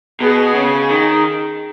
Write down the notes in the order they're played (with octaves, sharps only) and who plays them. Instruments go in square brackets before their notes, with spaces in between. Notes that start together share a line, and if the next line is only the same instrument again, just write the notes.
[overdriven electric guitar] B2 [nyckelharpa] G#4
[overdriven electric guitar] C#3
D#3